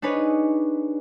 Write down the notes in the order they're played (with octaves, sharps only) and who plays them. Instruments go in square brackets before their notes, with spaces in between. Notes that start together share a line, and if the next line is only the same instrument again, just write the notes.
[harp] D4 D#4 G#4 B4 C#5